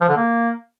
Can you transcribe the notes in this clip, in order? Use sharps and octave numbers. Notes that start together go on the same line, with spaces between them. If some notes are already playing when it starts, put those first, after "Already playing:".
F3
D3
A#3